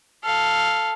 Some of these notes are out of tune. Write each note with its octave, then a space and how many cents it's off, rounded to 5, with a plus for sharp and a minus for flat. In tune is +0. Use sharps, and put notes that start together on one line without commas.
A4 +0 F5 +0